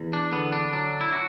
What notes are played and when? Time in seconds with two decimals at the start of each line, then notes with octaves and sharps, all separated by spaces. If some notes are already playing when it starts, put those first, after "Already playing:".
Already playing: E2
0.13 D4
0.32 D3 B3
0.52 D4
0.73 F#3 D4
1.01 E4
1.13 F#4